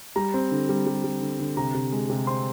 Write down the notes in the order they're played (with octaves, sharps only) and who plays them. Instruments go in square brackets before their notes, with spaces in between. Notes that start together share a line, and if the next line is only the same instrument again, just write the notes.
[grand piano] G3 A#5
C4
D3
G3
G3
G3
D3
D3
C3 A#5
C3
G#3
C3
C4 C6